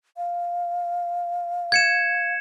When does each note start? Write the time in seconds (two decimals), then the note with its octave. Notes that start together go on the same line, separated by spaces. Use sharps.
0.17 F5
1.72 G#6 C#7 E7